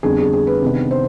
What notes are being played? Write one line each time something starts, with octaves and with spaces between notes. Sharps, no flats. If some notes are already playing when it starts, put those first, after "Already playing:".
F2 D3 G3 B3 D4 G#4
G#4
G#4
B4
C3 D#3 B3 D4
C5